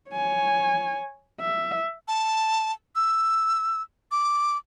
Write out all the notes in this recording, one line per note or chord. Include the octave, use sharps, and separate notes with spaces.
C#5 G#5
E5
A5
E6
D6